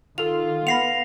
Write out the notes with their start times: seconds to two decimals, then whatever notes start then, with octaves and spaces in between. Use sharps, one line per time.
0.18 D#3 F4 A4 F7
0.67 B3 F#5 B5 A#6 C7 F7